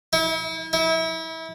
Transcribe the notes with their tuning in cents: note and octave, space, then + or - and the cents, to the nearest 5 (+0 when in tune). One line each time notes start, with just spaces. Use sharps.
E4 -35
E4 -30